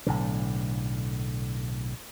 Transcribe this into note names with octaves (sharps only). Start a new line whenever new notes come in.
B1 A2 D3